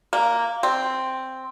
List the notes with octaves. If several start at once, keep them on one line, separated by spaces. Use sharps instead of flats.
A#3
C4